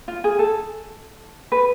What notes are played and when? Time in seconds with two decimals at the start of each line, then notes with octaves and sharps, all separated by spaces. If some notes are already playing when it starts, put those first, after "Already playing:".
0.08 F4
0.24 G#4
0.39 A4
1.52 B4